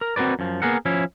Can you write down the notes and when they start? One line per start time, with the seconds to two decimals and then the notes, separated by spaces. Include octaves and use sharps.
0.01 A#4
0.16 C4 F#4 A#4 B4 D5
0.39 F#2 F3
0.62 A#3 B3 G#4 A#4 F#5
0.85 F3 C#4 E4